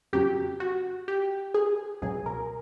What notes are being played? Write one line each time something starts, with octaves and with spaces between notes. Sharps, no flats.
F2 C#3 F#3 G4
F#4
G4
G#4
C#2 B2 F#3 G#4
A#4